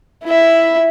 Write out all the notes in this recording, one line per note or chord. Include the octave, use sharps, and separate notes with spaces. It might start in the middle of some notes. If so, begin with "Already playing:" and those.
E4 E5